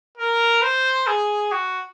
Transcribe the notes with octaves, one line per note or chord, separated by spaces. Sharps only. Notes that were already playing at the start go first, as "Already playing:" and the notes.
A#4
C5
G#4
F#4